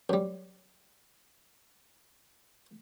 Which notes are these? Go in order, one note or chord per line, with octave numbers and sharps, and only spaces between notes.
F#2 G3